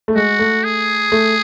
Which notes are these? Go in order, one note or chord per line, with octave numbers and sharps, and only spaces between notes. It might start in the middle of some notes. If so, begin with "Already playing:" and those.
A3
G#3 F#4
A3
G#4
A3